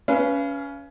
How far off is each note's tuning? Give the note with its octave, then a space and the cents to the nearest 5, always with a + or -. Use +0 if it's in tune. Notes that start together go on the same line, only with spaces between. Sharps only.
C#4 +20 B4 +0 F5 -30